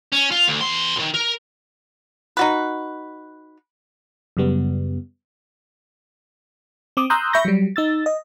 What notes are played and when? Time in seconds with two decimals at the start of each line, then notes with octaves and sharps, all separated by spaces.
0.13 C#4
0.31 F4
0.48 D2
0.61 E2 C6
0.96 B1 D#3
1.14 A#4
2.37 D#4 F#4 B4
4.37 F#2 C#3 G3 B3
6.97 C4 D6 D#6
7.10 A#5 C6 D#6 E6 F#6 G6
7.33 E5 B5 C#6 G6 A#6
7.45 F#3 G3
7.76 D#4 E6 A6
8.06 D#5